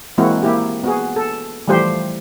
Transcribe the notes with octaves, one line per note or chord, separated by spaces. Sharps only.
E3 G#3 A#3 C4 E4 F#4
A#3 E4 G4
B3 F#4 G#4
A4
E3 F3 G3 A3 G4 C5